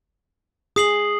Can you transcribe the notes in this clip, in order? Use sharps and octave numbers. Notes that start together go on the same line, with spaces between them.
G#4 D#6 C7 F#7